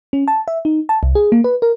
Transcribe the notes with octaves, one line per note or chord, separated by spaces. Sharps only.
C#4
A5
E5
D#4
A5
C2
G#4
A#3
B4
A#4